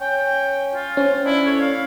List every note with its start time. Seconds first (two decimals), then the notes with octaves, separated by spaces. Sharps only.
0.01 C#4 G5
0.74 F4
0.97 C4 C#4
1.25 D4 E4
1.46 A2 C#5
1.61 F5